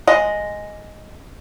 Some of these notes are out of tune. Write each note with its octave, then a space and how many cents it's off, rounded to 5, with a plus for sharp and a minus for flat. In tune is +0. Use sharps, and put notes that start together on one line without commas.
G#3 +0 D#5 +0 F#5 -30